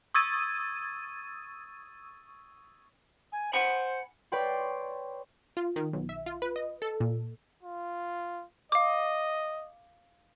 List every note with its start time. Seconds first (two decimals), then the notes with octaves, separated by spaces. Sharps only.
0.14 C#6 D#6 E6 G#6 A6 D#7
3.32 G#5
3.53 C5 F#5 G#5 B5
4.32 B4 C#5 D5 G5 C6
5.57 F4
5.76 D#3
5.93 B1
6.09 E5
6.26 F4
6.42 B4
6.56 D#5
6.82 A4
7.00 A#2
7.63 F4
8.72 D#5 F5 D6